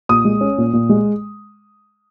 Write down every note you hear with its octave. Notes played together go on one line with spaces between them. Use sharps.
A#2 D#6
G#3
C#4
A#2
A#2
G#3